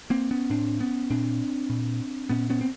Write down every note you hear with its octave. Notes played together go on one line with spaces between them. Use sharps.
A#3 C4
B3 C#4
A2 C4 D4
B3 C#4
A#2 C4 D4
A#2
A#2 B3 C#4
B3 C#4
C4